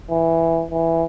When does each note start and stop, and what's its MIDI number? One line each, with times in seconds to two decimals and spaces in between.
0.10 0.64 52
0.71 1.04 52